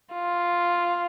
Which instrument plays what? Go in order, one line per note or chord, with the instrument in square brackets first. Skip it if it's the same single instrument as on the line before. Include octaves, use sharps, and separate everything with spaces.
[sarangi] F4